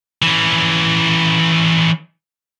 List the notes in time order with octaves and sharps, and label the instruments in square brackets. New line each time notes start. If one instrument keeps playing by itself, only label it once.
[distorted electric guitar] E3 C#4